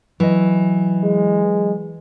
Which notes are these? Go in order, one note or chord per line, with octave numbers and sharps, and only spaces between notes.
E3 F#3 D#5
G#3